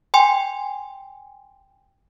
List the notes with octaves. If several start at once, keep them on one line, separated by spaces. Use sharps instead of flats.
G5 G#5 C6